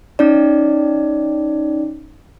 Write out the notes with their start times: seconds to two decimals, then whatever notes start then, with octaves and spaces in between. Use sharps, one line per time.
0.19 C#4 D#4 D5